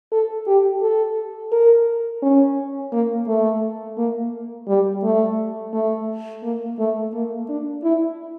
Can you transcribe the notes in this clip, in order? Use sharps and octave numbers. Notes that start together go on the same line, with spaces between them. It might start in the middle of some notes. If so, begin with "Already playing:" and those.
A4
G4
A4
A#4
C#4
A#3
A3
A#3
G3
A3
A3
A#3
A3
A#3
D4
E4